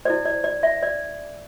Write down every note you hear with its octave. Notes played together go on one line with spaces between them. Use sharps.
E4 A4 C5 D5
D5
D5
E5
D5